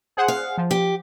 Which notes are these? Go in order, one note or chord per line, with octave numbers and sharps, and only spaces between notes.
G#4 C5 F#5
F5
F3
G4